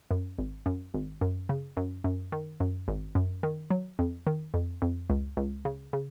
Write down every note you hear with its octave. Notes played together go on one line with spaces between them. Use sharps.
F#2
G#1
F#2
G#1
F#2
C#3
F#2
F#2
D#3
F#2
G#1
F#2
D#3
F#3
F2
D#3
F2
F2
C#2
C#2
C#3
C#3